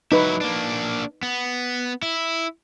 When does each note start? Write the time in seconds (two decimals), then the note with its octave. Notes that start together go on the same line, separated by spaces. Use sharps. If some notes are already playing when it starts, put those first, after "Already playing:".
0.12 F#3 D#4 E4 B4
0.41 A#3 D4
1.23 B3
2.02 E4